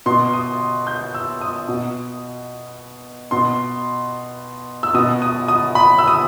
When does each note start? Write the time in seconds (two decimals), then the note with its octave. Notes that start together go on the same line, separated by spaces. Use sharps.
0.06 B2 C6
0.34 D#6
0.87 G6
1.15 E6
1.41 D#6
1.68 B2
3.31 B2 C6
4.83 E6
4.94 B2 D#6
5.22 D#6
5.48 D#6
5.75 B5
5.99 E6
6.07 D#6